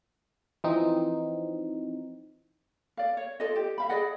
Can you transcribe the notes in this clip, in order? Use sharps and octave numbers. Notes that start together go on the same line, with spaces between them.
E3 F3 C4 D#4
D5 F5
C#5
F4 A4 D5 D#5
G4
E5 F5 B5
G#4 D5 D#5 F#5